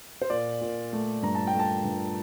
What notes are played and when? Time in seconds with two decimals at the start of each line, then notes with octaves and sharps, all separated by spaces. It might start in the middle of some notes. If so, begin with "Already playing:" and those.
0.22 C5
0.30 A#2 D5
0.61 A#2
0.93 A3
1.22 G2 A#5
1.35 A5
1.47 G5
1.54 A3
1.59 A5
1.84 G2